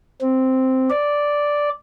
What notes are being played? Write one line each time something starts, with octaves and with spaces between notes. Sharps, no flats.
C4
D5